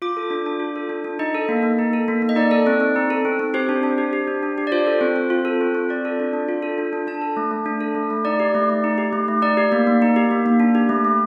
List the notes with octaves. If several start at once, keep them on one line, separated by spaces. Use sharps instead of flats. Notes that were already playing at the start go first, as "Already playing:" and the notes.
F4 D6
A4
D4
D4
F4
A4
D4
D4
D#4 D#5
A4
A#3
A#3
D#4
A4
A#3
A#3
D#5
D#4 D5
A4
C4
C4
D#4
A4
C4
C4
G4 C5
D4
D4
G4
G4
D4
D4
G4
D5
F4 C5
A4
C4
C4
F4
A4
C4
C4
F4 D5
A4
D4
D4
F4
A4
D4
D4
D4 A5
A4
A3
A3
D4
A4
A3
A3
D#4 D5
G4
A3
A3
D#4
G4
A3
A3
D#4 D5
G4
A#3
A#3
D#4
G4
A#3
A#3
D4
G4
A3
A3